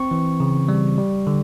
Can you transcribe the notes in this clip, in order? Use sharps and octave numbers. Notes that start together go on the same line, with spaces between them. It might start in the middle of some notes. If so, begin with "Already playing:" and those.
Already playing: C4 C#6
E3
C#3
G3
G3
D3